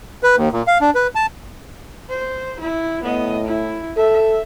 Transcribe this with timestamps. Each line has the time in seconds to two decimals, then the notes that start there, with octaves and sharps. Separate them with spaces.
0.23 B4
0.36 D#2
0.53 A#2
0.67 F5
0.81 D4
0.95 B4
1.15 A5
2.10 C5
2.60 E4
3.03 A2 B3 D#5
3.45 E4
3.97 A4 E5